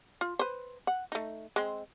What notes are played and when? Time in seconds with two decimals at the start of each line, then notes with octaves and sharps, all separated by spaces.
0.21 F4
0.39 B4 C5
0.87 F#5
1.12 A3 D#4
1.56 G#3 C4